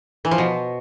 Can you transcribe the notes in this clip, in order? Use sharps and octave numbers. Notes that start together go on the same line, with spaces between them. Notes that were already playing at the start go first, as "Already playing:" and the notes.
E3
F3
B2